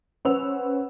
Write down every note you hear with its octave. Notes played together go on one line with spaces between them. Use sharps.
C#4 B4 C5 F#5 E6 F7